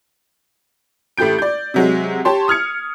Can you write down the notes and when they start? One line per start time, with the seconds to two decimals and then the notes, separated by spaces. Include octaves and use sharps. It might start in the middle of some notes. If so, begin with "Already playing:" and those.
1.17 A1 A3 G4 G6 D7
1.39 D5 G6
1.74 C3 F#3 G#3
2.25 G4 C#5 A5 C6
2.48 D#6 F6 G#6 C#7